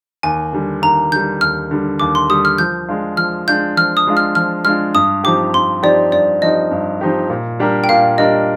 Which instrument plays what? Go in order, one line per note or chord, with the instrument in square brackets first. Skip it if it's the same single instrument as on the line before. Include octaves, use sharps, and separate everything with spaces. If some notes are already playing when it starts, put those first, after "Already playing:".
[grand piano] D#2 [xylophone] G#5
[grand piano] D3 G3
[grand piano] D#2 [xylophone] A#5
[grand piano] D3 G3 [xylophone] G6
[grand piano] D#2 [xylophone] F6
[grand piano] D3 G3
[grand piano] D#2 [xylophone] D6
[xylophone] C6
[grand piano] D3 G3 [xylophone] D#6
[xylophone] F6
[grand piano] F3 [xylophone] G6
[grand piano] G#3 D4 F4
[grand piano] F3 [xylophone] F6
[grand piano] G#3 D4 F4 [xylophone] G6
[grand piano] F3 [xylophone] F6
[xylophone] D#6
[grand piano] G#3 D4 F4
[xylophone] F6
[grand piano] F3 [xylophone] F6
[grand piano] G#3 D4 F4 [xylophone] F6
[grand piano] G2 [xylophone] D#6
[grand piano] F3 C4 D#4 G4 [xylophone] D6
[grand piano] G2 [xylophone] C6
[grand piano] F3 C4 D#4 G4 [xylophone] D5
[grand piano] G2 [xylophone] D5
[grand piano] F3 C4 D#4 G4 [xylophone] D#5
[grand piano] G2
F3 C4 D#4 G4
A#2
G3 D4 G4 A#4
[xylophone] G5
[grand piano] A#2 [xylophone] F5
[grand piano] G3 D4 G4 A#4 [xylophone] D#5